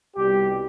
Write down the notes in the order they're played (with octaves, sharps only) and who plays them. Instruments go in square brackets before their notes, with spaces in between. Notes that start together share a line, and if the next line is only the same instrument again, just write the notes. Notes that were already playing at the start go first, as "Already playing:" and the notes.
[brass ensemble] C2 B2 G3 G4